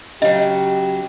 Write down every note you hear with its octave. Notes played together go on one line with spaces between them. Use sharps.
C#3 F#3 G4 C#5 D#5